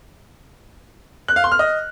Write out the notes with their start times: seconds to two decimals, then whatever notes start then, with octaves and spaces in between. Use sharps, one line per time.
1.28 F#6
1.36 F5
1.44 C6
1.52 F6
1.59 D#5